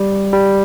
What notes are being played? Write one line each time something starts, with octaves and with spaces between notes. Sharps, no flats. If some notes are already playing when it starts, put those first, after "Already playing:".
Already playing: G3
G3